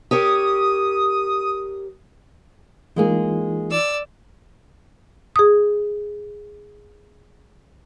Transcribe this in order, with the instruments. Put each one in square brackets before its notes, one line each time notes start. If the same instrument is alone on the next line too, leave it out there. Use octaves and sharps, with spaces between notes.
[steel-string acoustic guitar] G4 A#4 C#5 [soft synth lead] D#6
[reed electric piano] E3 D#4 F4 [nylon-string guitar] G#3 A#3 G#4
[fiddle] D5 E6
[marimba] G#4 D#6